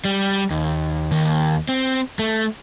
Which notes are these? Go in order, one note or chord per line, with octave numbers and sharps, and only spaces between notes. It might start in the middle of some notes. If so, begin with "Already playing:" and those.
G3
D#2
D#2
C4
A3